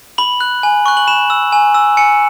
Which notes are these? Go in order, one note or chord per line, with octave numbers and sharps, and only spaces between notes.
B5 F#7
F#6
G#5
C#6 F#6
F#7
B5 E7
E6
G#5
E6
G#5 C#7